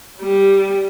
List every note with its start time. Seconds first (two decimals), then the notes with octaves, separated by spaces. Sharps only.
0.21 G3